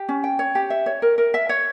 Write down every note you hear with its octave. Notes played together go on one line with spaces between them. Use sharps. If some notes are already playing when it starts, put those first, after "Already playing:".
Already playing: G4
C#4
G5
C#5
G4
E5
C#5
A#4
A#4
E5
C#5